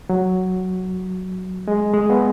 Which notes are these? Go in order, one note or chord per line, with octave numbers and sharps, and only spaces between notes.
F#3
G#3
G#3
B3